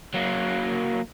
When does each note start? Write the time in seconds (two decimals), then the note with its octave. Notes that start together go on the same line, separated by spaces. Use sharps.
0.14 F#3 A#3